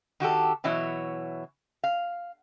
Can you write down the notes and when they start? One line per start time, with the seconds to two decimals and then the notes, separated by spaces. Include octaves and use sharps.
0.20 D#3 F#4 G4 A4
0.64 B2 E3 F#3 E4 C#5
1.83 F5